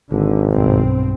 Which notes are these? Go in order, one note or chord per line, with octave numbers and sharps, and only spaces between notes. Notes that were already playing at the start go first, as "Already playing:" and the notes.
G#1 D3
B1 G2 C4